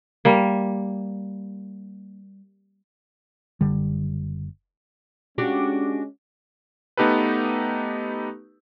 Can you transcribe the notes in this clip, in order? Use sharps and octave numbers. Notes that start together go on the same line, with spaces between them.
G3 A#3
F#1 D3 G3
G#3 C#4 D4 F#4 G4
A3 B3 D#4 G4 A4 B4